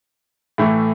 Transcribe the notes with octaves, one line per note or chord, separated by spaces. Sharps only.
A2 E3 A3